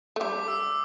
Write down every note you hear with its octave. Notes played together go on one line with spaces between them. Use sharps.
A3
G3 D6
D6
E6